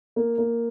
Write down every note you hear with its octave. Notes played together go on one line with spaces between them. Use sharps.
A#3
A#3